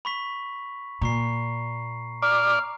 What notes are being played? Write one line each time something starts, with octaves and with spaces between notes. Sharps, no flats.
B5 C#6 B6
A#2 A#5 C#6 C7
D5 A#5 D6 F6